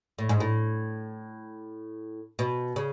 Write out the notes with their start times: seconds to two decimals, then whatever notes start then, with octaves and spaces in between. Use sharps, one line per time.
0.18 A2
0.29 G#2
0.40 A2
2.39 B2
2.76 C#3